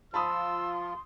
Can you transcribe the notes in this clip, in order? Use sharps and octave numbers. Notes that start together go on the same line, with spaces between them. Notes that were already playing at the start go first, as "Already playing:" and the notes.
F3 F4 A5 B5 C6 D#6 E6